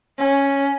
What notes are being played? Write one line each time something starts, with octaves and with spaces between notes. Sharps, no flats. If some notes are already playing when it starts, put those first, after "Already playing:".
C#4